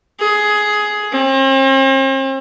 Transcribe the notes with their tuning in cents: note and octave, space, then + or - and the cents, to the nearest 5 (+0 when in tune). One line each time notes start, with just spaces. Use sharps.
G#4 +10
C4 +45